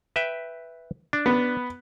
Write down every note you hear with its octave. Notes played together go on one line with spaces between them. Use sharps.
B4 E5 G5
D4
B3